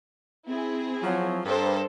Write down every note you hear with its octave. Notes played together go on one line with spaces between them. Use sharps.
C4 E4 G#4
F3 F#3
G2 A4 A#4 C5